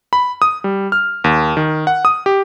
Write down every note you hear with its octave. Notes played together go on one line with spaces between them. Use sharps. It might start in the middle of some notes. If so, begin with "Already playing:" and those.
B5
D#6
G3
F6
D#2
D#3
F#5
D#6
G4